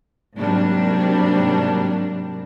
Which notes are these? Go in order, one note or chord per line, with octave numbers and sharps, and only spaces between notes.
G#2 C3 F#3 G3 A#3 D4